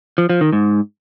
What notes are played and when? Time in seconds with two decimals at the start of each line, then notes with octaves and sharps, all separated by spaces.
0.18 F3
0.29 F3
0.41 D#3
0.53 G#2